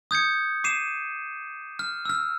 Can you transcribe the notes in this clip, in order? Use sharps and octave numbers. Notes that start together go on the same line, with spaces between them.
D#6 G6 G#6 C#7
D6 C7 D#7 E7
F6
E6 F6